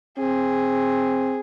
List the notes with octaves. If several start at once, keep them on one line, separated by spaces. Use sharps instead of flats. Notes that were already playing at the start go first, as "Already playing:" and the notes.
C4 G#4